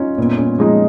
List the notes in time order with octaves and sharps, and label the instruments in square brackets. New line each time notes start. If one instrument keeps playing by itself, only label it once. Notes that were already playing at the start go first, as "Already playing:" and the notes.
Already playing: [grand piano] C#4 D#4 F4
[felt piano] A#2 [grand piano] B3
[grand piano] C#4
[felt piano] F3 G#3 D#4